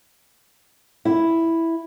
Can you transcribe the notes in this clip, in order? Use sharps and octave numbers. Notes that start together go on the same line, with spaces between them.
E4